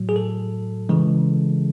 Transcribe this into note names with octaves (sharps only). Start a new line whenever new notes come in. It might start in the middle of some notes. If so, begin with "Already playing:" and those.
Already playing: A2 F#3
G#4
A4
C#3 E3 G#3